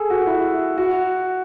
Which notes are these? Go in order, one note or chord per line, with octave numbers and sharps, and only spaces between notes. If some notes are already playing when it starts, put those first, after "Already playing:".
Already playing: G#4 A4
F#4
E4
F#4